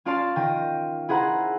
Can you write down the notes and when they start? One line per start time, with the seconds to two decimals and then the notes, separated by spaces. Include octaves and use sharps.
0.05 C#4 F4 D5 F5 A5 C6
0.36 D#3 G5 A#6 D#7
1.09 E4 G#4 C5 F#5 A#5